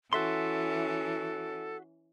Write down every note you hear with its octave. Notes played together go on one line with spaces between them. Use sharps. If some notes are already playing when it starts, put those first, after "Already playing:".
E3 C#4 F#4 A4 E5 C6